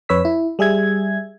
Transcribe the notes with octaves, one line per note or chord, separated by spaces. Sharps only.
F2 B4 C#5 E6 B6
E4
G3 G#4 E5 G#6